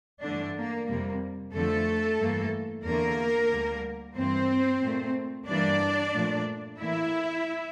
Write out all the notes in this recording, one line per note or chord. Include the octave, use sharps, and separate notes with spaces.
G2 D3 E3 A3 D4
A#3
F2 C3 G3 A#3
F2 D3 F3 A3 A4
G2 E3 A#3
E2 D3 A3 A#3 A#4
D2 D3 G3
G2 E3 A#3 C4 C5
A#2 A3
G2 E3 G3 A#3 D4 D5
A#2 F3 A3
A2 E3 A#3 E4 E5